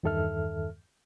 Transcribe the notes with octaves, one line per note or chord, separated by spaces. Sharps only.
E2 G2 D#3 A4 E5 F6